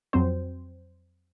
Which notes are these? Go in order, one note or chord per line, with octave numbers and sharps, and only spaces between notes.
F2 F#3 C4 C5